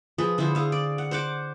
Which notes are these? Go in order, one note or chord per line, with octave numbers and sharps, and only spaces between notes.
F3 G#4 B4
D3 E4 G#4 C5
G#4 F5
D5
F#5
C5 F#5 D6